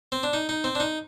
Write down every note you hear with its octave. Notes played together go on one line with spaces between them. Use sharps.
C4
D4
D#4
D#4
C4
D4
D#4